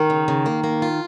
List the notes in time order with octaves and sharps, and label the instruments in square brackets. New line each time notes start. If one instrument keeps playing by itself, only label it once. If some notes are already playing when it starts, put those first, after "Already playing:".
Already playing: [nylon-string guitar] D#3
[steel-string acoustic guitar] C#3
C#3
A#3
A#3
F4